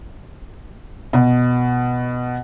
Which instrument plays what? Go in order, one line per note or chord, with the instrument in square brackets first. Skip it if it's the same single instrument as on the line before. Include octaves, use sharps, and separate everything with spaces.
[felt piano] B2